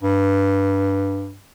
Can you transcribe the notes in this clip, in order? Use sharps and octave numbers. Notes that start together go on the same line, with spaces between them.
G2